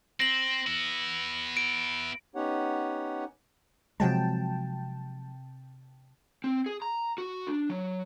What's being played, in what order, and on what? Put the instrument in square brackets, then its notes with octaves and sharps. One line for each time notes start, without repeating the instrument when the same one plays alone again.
[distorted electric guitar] C4 [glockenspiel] A#6 F#7
[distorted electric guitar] B3 E4
[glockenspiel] D7
[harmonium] B3 C#4 D#4 G4 C#5 F#5
[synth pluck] C3 G5 A5 [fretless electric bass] F3 F#3 G#3
[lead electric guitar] C4
G#4
A#5
F#4
D4
F#3